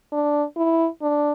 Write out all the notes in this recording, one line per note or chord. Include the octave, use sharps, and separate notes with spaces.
D4
E4
D4